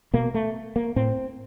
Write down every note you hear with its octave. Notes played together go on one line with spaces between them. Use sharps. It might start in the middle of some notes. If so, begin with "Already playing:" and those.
B2 A#3
A3
A#3
A2 C4